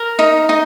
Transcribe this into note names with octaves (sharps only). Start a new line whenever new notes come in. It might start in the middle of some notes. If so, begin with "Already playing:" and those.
Already playing: A#4
D#4
D#4